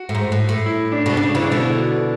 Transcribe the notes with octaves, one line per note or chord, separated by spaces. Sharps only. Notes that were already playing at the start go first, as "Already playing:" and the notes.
Already playing: F#4
A2
G#2
A2
A2
E4
D4
B2
C#3 D4
C#3 E3 E4
D4
B2 D3 E4
E4